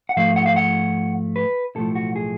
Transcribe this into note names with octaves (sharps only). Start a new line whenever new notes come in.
F#5
G#2 F3 A3 F5
F#5
F5
F#5
B4
B1 A2 F3 A3 A4
F#4
G#4